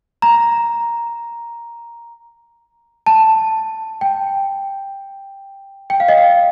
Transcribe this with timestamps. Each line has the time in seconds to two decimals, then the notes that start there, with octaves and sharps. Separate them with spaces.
0.22 A#5
3.06 A5
4.01 G5
5.90 G5
6.00 F5
6.08 D#5
6.18 F5